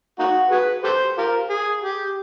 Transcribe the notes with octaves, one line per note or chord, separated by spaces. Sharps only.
A#3 D#4 F#4
F#4 G#4 B4
G4 A4 C5
F4 G4 A#4
G#4
G4